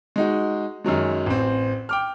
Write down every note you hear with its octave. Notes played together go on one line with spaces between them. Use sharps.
G#3 D#4 F#4
F#2 D#3 F#3 G#3
A1 C4
G5 D6 F6